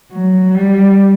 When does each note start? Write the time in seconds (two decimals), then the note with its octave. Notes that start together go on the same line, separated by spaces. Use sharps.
0.12 F#3
0.55 G3